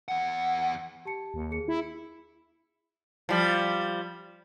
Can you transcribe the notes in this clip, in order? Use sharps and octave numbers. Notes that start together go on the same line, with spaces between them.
E2 F#5
G4 A5 C#7
D#2
G#4 C#7
E4
F3 G3